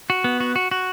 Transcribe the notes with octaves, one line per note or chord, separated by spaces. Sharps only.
F#4
B3
F#4
F#4
F#4